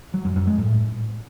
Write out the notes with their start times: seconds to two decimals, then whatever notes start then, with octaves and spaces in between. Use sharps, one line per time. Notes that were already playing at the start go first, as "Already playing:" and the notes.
0.14 F#3
0.25 F#2
0.36 F#2
0.47 G#3
0.58 A2